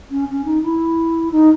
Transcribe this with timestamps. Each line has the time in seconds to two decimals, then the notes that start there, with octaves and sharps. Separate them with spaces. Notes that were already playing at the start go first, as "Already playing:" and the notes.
0.11 C#4
0.29 C#4
0.45 D#4
0.63 E4
1.31 D#4